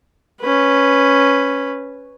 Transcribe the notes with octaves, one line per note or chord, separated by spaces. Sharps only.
C#4 B4